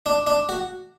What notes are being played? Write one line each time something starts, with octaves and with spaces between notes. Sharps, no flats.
D4
D4
F#4